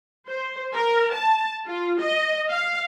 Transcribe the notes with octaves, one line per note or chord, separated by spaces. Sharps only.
C5
A#4
A5
F4
D#5
F5